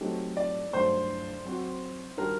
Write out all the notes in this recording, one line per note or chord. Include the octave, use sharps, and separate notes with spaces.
F#3 A3 C4 D#4 G4
D5
G2 F#3 A3 C5
F#3 C4 F#4
D#3 G3 D4 F#4 A#4